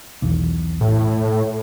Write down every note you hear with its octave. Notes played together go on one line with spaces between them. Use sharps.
B1 E2
A2